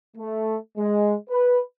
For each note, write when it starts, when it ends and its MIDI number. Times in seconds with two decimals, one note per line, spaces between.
0.17 0.56 57
0.78 1.14 56
1.29 1.59 71